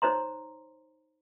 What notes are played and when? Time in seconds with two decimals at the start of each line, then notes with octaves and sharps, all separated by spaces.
0.02 D#4 C5 C#5 A#5 C6